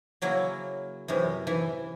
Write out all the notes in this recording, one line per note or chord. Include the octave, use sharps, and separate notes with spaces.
C#3 F#3 A#3 E4
F#2 C3 E3
E3